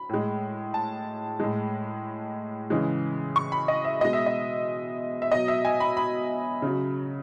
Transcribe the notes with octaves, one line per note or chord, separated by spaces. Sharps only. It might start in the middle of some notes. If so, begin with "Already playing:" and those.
Already playing: B5
A2 G#3
A5
A2 G#3
C#3 E3 G#3
C#6
B5
D#5
E5
B2 G#3 D#5
E5
D#5
E5
B2 F#3 D#5
E5
G#5
B5
B5
C#3 F#3